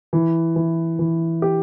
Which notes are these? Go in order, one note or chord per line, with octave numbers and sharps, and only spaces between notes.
E3
E3
E3
G4